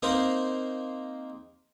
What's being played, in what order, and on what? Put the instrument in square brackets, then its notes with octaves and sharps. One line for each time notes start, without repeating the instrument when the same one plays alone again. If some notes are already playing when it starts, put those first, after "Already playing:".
[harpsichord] A#3 C4 D#4 A#4 C5